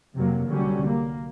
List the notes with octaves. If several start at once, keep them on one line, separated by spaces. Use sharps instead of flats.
F2 C3 F#3 A#3
C2 D3 F#3 G3 C#4
A#3